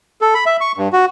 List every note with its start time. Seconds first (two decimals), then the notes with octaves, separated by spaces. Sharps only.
0.21 A4
0.35 B5
0.46 E5
0.61 C#6
0.77 G2
0.93 F#4